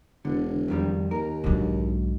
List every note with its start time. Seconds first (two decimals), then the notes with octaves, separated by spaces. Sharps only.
0.25 E1 D3
0.68 F2 D#3 G3
1.11 D#2 A#4
1.44 B1 G#2 D3 F#3